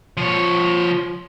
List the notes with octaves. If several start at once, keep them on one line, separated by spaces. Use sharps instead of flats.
F3 C#5